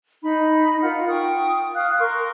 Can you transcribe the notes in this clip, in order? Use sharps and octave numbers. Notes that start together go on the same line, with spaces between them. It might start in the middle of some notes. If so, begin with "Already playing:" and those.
D#4 B5
F4 A#4 F#5 F6
G5 C#6 D#6
F5 D#6 F6 F#6
A#4 C6 C#6